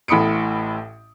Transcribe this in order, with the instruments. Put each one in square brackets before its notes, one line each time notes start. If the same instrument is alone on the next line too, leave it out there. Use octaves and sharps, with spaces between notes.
[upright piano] A1 A2 B5 D#6 C#7 D7